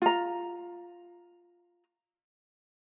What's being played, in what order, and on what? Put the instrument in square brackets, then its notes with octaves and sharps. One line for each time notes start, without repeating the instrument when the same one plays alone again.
[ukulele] F4 A#5